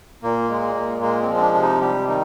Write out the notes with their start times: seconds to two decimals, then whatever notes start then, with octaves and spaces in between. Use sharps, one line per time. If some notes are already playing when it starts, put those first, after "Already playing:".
0.23 A#2 A#3
0.49 G#3
0.76 A#2
1.01 G#3 A#3
1.22 C4
1.28 F3
1.36 C4
1.41 D4
1.54 C3 D4
1.62 D#4
1.81 G3 G4
2.08 D#3 D#4